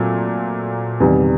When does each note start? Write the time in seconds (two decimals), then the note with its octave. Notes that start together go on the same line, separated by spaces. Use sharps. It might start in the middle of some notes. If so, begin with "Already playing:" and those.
Already playing: A#2 F#3 A3 C4
1.00 E2 C3 D#3 G3